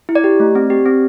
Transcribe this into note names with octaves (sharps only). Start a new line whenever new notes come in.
E4
D5
G4
A3
C4
G4
C4